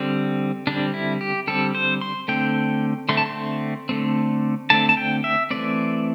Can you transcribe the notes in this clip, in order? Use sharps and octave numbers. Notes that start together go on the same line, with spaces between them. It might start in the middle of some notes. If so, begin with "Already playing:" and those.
Already playing: D3 G3 C4
D3 G3 C4 D4
E4
G4
D3 G3 C4 A4
C5
C6
D3 A3 C4 G5
D3 A3 C4 C6
A5
C6
D3 A3 C4
D3 A3 C4 A5
A5
G5
E5
E3 A3 C4 D5